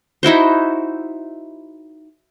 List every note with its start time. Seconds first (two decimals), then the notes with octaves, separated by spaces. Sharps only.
0.23 D#4 E4 F#4 C5